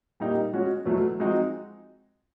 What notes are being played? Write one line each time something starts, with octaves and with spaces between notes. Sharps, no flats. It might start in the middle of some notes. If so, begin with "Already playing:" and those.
A#2 G3 A#3 D#4
G#3 C#4 F#4
E2 B2 F#3 A3
F3 G#3 C4 D#4 F#4